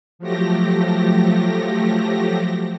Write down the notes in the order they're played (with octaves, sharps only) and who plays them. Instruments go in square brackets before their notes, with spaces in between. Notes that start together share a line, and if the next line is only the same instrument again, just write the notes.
[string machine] F3 F#3 A3 G4 A#6